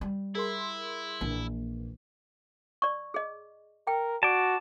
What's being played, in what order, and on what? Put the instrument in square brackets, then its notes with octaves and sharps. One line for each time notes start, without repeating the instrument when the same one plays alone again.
[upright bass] G3
[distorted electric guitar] E4 [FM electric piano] G#4 A#4 C6
[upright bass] A#1 [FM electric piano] A#2 E3 A#3
[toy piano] D5 C#6
G#4 D#5
[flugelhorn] A#4 [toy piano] G5
[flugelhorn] F#4 [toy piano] D5 [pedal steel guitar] A5 D6